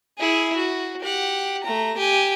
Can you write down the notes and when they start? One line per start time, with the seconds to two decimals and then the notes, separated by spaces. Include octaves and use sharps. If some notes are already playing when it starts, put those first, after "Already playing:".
0.18 E4 G#4
0.56 F#4
1.01 G4 F#5
1.64 A3 A#5
1.97 G4 G#5